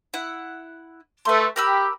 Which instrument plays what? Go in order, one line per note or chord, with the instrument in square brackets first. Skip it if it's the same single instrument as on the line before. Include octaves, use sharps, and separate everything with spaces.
[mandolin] E4 F#5
[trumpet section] A3 [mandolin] B4 C6
[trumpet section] G4 [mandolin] A#4 B5 E6